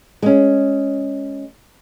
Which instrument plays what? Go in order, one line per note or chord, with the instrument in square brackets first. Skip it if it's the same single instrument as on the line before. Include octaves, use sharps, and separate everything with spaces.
[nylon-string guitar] G#3 C#4